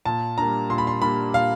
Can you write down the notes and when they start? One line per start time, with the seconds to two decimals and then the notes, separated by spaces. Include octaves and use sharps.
0.05 A#2 A5
0.38 G3 A#3 D4 A#5
0.70 A#2 C6
0.78 B5
0.87 C6
1.02 G3 A#3 D4 B5
1.34 A#2 F5